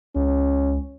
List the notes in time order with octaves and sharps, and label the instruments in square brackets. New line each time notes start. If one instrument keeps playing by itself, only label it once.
[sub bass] C#2 [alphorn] C#4